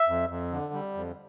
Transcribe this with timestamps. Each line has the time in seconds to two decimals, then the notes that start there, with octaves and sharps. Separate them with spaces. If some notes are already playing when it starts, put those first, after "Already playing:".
Already playing: E5
0.08 F2
0.29 F2
0.51 D3
0.73 G3
0.94 F2